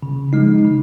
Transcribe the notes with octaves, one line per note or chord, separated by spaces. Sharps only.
C#3
F3 G#3 D#4
C#3